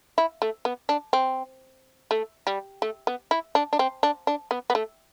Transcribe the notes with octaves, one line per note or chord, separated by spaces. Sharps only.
E4
A3
B3
D4
C4
A3
G3
A3
B3
E4
D4
D4
C4
D4
D4
B3
B3
A3